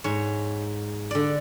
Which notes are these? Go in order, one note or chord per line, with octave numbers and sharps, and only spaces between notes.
G#2 C#5
D3 D5